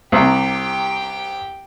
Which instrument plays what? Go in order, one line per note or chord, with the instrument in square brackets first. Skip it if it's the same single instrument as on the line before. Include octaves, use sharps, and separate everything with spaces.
[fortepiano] C2 C3 [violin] G4 G5